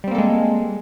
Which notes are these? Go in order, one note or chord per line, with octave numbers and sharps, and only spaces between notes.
G3 G#3 A#3 C4 A4